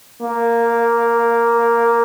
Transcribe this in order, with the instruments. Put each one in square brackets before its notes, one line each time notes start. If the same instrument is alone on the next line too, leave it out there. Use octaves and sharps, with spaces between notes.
[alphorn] A#3